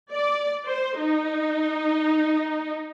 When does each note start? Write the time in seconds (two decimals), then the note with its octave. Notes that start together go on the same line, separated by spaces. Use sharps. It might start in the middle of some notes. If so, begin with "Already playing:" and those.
0.12 D5
0.66 C5
0.98 D#4